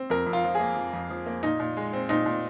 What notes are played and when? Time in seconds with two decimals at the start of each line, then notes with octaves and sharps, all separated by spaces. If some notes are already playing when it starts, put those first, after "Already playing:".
Already playing: C4
0.10 F2 A#4
0.26 F2
0.33 F4
0.44 F3
0.55 A#3 G#4
0.76 F2
0.93 F2
1.10 F3
1.26 A#3
1.43 A#2 D#4
1.60 A#2
1.77 G#3
1.93 C4
2.09 A#2 D#4
2.26 A#2